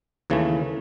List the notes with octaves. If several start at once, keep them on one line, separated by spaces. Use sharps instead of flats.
D#2 C#3 E3 A3